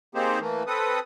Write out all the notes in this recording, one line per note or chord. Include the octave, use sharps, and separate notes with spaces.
A#3 C4 D#4 G4 G#4 C5
E3 A3 A#3
C4 A4 B4 D#6